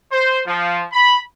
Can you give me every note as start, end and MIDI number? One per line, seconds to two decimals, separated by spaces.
0.12 0.41 72
0.47 0.82 53
0.92 1.17 83